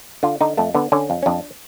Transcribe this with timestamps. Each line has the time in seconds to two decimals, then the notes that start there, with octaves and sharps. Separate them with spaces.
0.23 D3 F4
0.41 D3 D#4
0.57 F2 A3
0.75 D3 B3
0.92 D3 C#4
1.10 F2
1.23 C#4
1.26 F2 D4